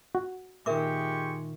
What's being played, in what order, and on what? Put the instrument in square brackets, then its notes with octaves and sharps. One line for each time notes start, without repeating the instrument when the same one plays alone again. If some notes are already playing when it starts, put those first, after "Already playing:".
[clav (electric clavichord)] F#4
[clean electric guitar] A#2 D#3 [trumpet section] G#3 G4 C#6 [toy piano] A#4 E5 D6